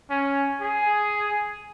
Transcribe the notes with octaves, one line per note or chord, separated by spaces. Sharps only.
C#4
G#4